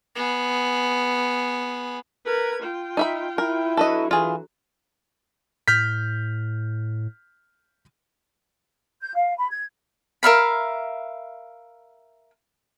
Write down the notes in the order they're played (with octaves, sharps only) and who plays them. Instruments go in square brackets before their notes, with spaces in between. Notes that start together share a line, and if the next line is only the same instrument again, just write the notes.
[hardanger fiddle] B3 G#4
[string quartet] A#4 B4 G#6
F4 G5
[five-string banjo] D#4 E5 B5
[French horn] E4 [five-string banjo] A#4
[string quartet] D3 F#3 [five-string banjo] A4 B4 D#5
[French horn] E3 [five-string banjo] F4 G#4
[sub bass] A2 [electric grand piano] F6 G6 B6
[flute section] G6
F5
B5
G#6
[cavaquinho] A#4 E5 F5 B5